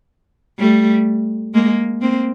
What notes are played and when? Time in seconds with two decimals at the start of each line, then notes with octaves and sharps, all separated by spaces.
0.59 G3 A3
1.54 G#3 A#3
2.01 A#3 C4